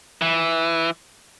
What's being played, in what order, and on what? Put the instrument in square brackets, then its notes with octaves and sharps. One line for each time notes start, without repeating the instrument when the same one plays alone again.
[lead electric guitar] E3